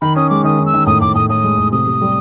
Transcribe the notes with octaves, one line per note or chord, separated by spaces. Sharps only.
D#3 B5
C#4 D#6
G#3 D6
D#3 D#6
D#3
E6
D#3
A2 D#6
A2 D6
A2 D#6
A2 D#6
G#3
A2
C3 D#6
C3
G3